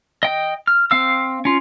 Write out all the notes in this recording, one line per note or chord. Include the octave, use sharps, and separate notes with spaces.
D#5 G5
F6
C4 F5 E6
C#4 F4